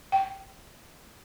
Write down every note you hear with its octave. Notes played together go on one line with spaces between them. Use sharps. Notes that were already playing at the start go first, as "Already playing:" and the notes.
G5